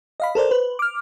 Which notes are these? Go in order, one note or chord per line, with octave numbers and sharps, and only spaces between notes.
D#5 F5 B5
A4 A#4 C5 D5
B4 C5
D6 F6